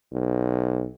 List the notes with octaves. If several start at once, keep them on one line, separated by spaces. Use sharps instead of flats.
B1